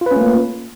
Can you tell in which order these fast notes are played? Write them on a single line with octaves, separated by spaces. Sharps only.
F4 B4 C#4 A3 A#3